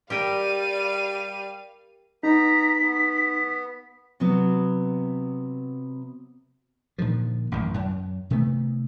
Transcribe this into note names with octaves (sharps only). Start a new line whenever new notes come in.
G3 G4 A#4 F5 G5 D#7
B3 D#4 A#5 B6
B3
C3 F#3 B3
A#2 D3 D#3 F3
A1 F#2 D#3
F#2
C3 D#3 A3 B3